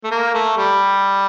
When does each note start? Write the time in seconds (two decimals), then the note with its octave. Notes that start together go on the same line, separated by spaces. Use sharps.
0.04 A3
0.11 A#3
0.34 A3
0.57 G3